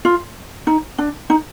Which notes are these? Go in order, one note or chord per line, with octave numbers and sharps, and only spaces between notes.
F4
D#4
D4
D#4